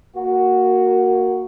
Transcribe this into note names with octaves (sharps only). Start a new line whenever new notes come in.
A#3 F#4